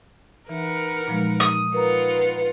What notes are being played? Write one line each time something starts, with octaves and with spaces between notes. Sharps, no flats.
E3 D#4 A#4 B4 F#5
A#2 F3 G#3 D#4
D#6
D#4 F4 A#4 B4 F#5 A#5